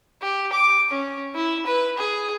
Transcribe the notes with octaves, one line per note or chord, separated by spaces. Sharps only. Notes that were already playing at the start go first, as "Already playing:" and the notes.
G4
D6
C#4
E4
B4
G#4